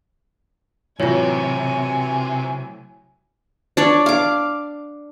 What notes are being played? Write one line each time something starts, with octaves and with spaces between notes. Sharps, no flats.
A2 C3 E3 F#3 F4 C#5 G#5
D4 C#5 D5
F5 D6